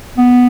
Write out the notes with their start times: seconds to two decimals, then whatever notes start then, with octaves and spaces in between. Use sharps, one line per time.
0.17 B3